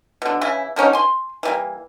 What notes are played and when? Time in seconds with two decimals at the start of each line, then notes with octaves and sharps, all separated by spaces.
0.22 B2 D3
0.41 C#3 E3 E4
0.76 D3 A#3 C#4 D#4
0.93 G#5 C6
1.43 E3 G3 A#3